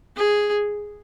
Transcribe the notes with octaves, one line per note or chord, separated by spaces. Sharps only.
G#4